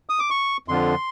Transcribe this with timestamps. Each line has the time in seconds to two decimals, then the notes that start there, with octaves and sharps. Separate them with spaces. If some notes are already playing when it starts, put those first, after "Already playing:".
0.09 D#6
0.19 D6
0.30 C#6
0.68 F2 D3 F3 C6